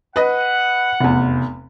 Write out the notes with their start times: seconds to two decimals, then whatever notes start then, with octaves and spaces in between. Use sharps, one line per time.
0.16 B4 D#5 F#5
1.00 F1 E2